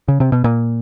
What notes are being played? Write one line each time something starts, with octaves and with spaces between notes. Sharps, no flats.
C#3
C3
B2
A#2